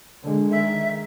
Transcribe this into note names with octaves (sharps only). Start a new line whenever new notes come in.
D3 G#3
D#3 E5